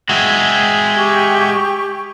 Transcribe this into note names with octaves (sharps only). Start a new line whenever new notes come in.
G#3 F#4 E5 G5 G#5
G4 C#6